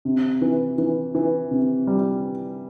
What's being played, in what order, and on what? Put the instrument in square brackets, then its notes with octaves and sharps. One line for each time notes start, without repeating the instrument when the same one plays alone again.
[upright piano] C3
E3
E3
E3
C3
G3